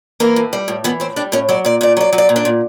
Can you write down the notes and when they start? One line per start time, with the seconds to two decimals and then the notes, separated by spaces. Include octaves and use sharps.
0.20 E3 A#3 A#4
0.36 A2
0.53 G3
0.68 A2
0.84 E3 B3 B4
1.00 A2 C4 C5
1.16 G3 D4 D5
1.32 A2 C#4 C#5
1.49 F#3 D5
1.65 A#2 D5
1.81 A#2 D5
1.97 F#3 D5
2.13 F#3
2.18 D5
2.29 A#2
2.36 D4 D5
2.45 A#2